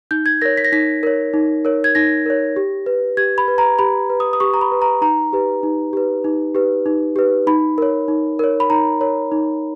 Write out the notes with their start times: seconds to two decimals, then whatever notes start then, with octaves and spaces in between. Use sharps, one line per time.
0.11 D#4 G6
0.26 G#6
0.42 A#4 C#5 A#6
0.57 B6
0.65 A#6
0.72 D#4 B6
1.03 A#4 C#5
1.33 D#4
1.65 A#4 C#5
1.84 G#6
1.95 D#4 A#6
2.26 A#4 C#5
2.56 G4
2.86 B4
3.17 G4 G#6
3.38 B5
3.48 B4
3.58 A#5
3.79 G4 B5
4.10 B4
4.20 D#6
4.33 D#6
4.40 G4 C#6
4.54 A#5
4.61 B5
4.71 B4
4.82 A#5
5.01 D#4 A#5
5.33 G4 B4
5.63 D#4
5.93 G4 B4
6.24 D#4
6.55 G4 B4
6.86 D#4
7.16 G4 B4
7.47 D#4 B5
7.78 A#4 C#5
8.08 D#4
8.39 A#4 C#5
8.60 B5
8.70 D#4 A#5
9.01 A#4 C#5
9.31 D#4